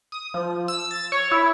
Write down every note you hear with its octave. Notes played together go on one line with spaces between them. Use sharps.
D#6
F3
E6
A6
C#5
E4